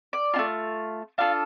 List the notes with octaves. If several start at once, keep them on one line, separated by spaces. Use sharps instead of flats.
D5
A3 D4 F4
D4 F4 A4 F5